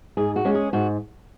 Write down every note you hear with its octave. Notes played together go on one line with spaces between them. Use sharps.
G#2 G#4
F#4
G#3 C#4
G#4
G#2 F#4